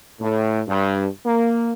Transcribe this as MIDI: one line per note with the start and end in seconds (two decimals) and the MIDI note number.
0.20 0.61 45
0.68 1.06 43
1.25 1.73 58